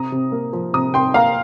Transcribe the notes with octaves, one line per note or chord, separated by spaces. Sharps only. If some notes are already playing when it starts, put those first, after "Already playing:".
Already playing: C3 A#5 D#6
C3
A#3
F3
C3 A#5 D#6
C3 G5 C6
A#3 F5 A#5